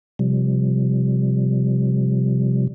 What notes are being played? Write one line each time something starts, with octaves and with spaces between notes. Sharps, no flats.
C3 F3 G3